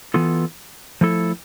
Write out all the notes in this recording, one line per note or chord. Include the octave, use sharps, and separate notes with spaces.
E3 B3 F4 A4
F3 A3 E4 A4